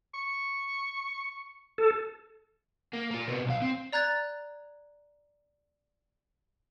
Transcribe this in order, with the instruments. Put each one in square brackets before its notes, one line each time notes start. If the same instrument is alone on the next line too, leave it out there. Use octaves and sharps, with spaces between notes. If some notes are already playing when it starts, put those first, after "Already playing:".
[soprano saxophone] C#6
[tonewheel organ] A4
[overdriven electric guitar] A#3
A#3 F4
C3 B3
B1 F5
C4
[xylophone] D5 A#5 F#6 G#6 A6